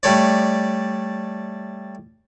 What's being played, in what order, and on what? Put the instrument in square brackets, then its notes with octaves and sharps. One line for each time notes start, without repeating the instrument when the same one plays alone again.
[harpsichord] G3 A3 C#5 D5